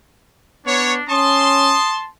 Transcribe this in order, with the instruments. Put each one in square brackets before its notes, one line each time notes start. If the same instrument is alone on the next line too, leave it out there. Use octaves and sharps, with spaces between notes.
[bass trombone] B3 [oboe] D4 [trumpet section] C#5
[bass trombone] C#4 [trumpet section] A5 C6 [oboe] D#6